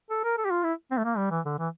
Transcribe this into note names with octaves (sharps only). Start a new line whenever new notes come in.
A4
A#4
A4
G4
F4
E4
C4
A3
A#3
G3
E3
D3
E3